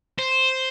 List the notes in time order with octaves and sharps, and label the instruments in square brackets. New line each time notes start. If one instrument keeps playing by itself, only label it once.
[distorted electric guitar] C5